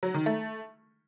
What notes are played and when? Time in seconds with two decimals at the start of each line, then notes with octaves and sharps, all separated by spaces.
0.03 F#3
0.14 D#3
0.26 A3